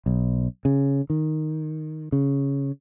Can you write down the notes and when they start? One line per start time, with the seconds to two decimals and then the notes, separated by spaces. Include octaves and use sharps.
0.06 B1
0.65 C#3
1.10 D#3
2.12 C#3